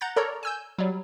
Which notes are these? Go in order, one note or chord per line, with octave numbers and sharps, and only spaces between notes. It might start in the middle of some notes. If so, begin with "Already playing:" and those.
F#5 A#5 G6 A6
A4 A#4 C#5 D5 A#5
G#5 E6 G6
F#3 G3